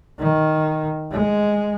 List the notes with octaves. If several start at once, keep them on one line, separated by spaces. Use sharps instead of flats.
D#3
G#3